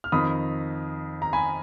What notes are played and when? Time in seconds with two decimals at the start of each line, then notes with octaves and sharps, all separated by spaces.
0.04 F6
0.12 F2 D#3 B5 D#6
1.22 A#5
1.33 G#5 B5